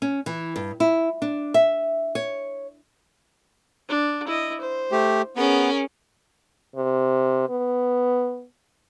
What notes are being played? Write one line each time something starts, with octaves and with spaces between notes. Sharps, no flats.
C#4
E3
G2
E4
D4
E5
C#5
D4
E4 D#5
C5
A3 G4
B3 C#4 G#4 A#4
C3
B3